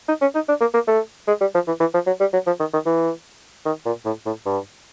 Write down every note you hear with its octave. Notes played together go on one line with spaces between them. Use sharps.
D#4
C#4
D#4
D4
A#3
A#3
A3
G#3
G3
F3
E3
E3
F3
F#3
G3
F#3
F3
D#3
D#3
E3
D#3
A#2
A2
A2
G2